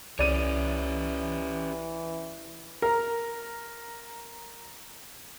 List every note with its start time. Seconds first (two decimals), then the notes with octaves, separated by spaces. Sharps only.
0.19 C2 E3 C#4 G4 C#5 D5 D#7
2.82 A#4 A#5